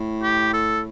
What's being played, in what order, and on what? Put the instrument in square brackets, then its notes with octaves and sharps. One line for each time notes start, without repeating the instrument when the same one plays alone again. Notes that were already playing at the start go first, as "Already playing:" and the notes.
Already playing: [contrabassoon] A2
[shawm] G4
A4